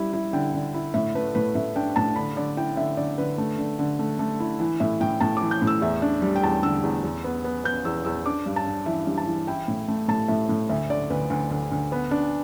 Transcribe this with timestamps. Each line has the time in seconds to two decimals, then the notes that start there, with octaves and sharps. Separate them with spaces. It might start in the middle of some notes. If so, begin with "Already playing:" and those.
Already playing: G3 E4
0.13 E4
0.33 D3 G5
0.54 D3
0.74 E4
0.94 A2 E5
1.15 A3 B4
1.35 A2 B4
1.55 A2 E5
1.76 D4 G5
1.96 A2 A5
2.16 D3 B5
2.36 D3 D5
2.57 E4 G5
2.77 D3 E5
2.97 D3 D5
3.18 D3 B4
3.38 A3
3.58 D3
3.79 D3
3.99 A3
4.19 A3
4.40 E4
4.60 E3
4.80 A2 E5
5.00 A2 G5
5.20 A2 A5
5.37 E3 D6
5.51 G6
5.62 A2
5.67 E6
5.81 E2 E5
6.02 D4
6.22 G3
6.36 G5
6.43 E2 A5
6.63 D3 E6
6.83 E2
7.04 E2
7.24 B3
7.44 B3
7.64 B3 G6
7.85 E2 E6
8.05 E2 E6
8.26 D4 D6
8.46 G2
8.56 A5
8.67 D4
8.86 E3 E5
9.07 G2
9.18 A5
9.27 E3
9.47 E4 G5
9.68 A2
9.88 A3
10.08 A2 A5
10.28 A2 E5
10.49 A2
10.70 D2 E5
10.90 D3 D5
11.10 D2 B4
11.30 D2
11.51 D2
11.72 D2
11.92 B3
12.11 D4